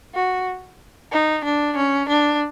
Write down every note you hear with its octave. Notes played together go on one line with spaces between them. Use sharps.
F#4
D#4
D4
C#4
D4